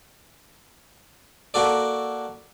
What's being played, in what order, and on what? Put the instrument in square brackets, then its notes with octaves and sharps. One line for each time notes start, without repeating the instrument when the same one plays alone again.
[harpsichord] A#3 F#4 A4 D5